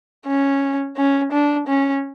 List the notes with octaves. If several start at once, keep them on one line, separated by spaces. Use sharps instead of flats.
C#4
C#4
D4
C#4